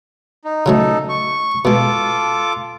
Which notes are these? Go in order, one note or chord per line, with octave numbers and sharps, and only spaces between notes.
D#4
C#3 F#3 A3 D#4 A4
C#6
B2 G#3 F4 A4 D6